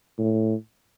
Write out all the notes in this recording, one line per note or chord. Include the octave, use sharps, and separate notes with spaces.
A2